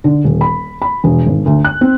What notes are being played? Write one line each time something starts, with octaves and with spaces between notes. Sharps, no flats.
D3
D#1
B5
B5
E1
G#1
D2
F#6
C4